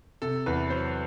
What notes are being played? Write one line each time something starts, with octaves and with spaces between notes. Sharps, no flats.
C3 A4
E2 B4
F#3 C5